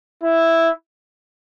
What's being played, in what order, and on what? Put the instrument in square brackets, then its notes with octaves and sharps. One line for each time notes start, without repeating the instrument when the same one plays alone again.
[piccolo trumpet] E4